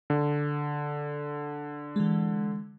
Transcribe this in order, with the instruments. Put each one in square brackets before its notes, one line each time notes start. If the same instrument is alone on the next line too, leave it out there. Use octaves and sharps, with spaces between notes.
[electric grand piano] D3
[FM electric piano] E3 G#3